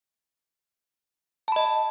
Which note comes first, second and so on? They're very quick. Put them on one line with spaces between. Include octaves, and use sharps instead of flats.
A5 B5 D#5